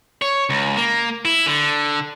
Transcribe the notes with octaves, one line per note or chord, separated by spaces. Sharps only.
C#5
C#2
A#3
E4
D3